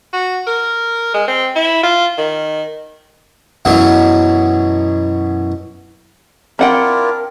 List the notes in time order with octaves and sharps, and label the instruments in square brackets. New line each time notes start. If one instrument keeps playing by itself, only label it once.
[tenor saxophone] F#4
A#4
G#3
C4
E4
F4
D#3
[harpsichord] F#2 B2 E3 F#3
[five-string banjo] C4 F#5 G5 [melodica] D4 E4 F4 [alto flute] A#4